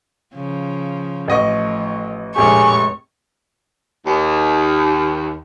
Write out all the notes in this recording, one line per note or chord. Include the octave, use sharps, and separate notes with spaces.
C#3 F3
A1 F3 A3 D#5 C#6
F1 A#1 A2 G#3 G4 G#4 C#5 C#6
D#2